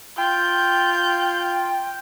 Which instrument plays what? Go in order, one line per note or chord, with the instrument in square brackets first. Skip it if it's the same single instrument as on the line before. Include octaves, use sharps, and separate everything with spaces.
[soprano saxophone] F4 [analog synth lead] G5 [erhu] G6